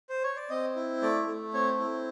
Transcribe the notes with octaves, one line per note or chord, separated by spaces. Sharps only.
C5
C#5
D5
C4 D#5
E4
A3 D5
A3
C4 C#5
E4